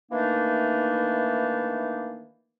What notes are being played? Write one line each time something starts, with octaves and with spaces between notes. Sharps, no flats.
D#3 E3 A3 A#3 D4 D#4